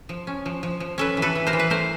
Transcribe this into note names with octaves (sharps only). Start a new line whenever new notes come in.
F3
C#4
F3
F3
F3
C#4 A4 B4
E3
A4 B4
E3
A#4 C5
E3
B4
A3 A#4 C5